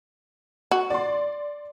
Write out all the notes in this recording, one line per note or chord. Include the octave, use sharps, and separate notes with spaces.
F#4
D5 C6